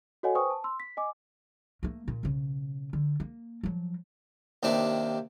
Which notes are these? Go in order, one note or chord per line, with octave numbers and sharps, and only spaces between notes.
F#4 A4 C#5 D#5 F#5 G#5
B4 C5 G5 G#5 C#6 D#6
A5
C6 E6
B6
D#5 G#5 D6
A3 A#3
A#2
B1 C#3
D3
A#3
F3 F#3
D#2 C3 D4